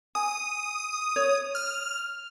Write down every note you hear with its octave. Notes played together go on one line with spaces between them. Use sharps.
G#5 D#6
C#5
F6